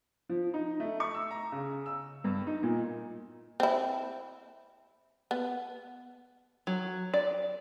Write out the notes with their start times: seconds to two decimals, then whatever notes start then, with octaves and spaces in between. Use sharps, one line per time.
0.29 F3
0.54 D#4
0.80 A3
1.00 C#6
1.14 E6
1.31 A#5
1.52 C#3
1.86 E6
2.24 G2
2.47 D#4
2.63 A#2
3.60 C4 E4
5.31 B3
6.67 F#3
7.14 D5